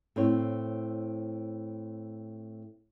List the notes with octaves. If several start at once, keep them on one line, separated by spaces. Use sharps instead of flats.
A2 C4 C#5